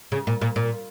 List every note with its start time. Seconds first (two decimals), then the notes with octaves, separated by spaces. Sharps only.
0.12 C#3
0.27 A#2
0.41 A#2
0.56 A#2